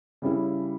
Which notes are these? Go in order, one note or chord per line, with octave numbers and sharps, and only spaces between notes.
C#3 G3 C#4 E4